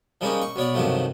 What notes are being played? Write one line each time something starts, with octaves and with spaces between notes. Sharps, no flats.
F3 G3 G#3 A#3 C#4 D#4
C#6
B1 B3 C#5 D5
G2 C3 D#3 F3 F#3 A3